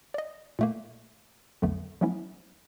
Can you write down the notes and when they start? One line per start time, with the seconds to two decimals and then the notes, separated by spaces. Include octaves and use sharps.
0.14 D5 D#5
0.59 A#2 A3 A#3
1.62 B1 F2 D3 F#3 A3 B3
2.01 F3 F#3 A3 B3 C#4 E4